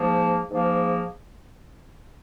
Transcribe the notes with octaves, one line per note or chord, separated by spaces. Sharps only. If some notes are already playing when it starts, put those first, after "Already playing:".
Already playing: G#2 F3 A#3
G#2 F3 A#3